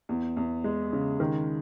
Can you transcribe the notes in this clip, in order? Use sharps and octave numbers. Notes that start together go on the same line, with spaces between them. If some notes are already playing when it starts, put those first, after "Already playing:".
E2
E2
G#3
C#3
D#3